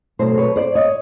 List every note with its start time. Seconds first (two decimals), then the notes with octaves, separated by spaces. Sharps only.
0.19 B2 F#3 A3 A#4 C5
0.38 B4 C#5
0.56 C5 D5
0.75 C#5 D#5